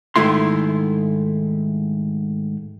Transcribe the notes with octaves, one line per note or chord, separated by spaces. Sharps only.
G#2 D#3 A3 E4 C6